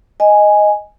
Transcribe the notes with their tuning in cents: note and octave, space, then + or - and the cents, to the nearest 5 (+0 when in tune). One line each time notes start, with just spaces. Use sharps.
D#5 +0 G#5 +0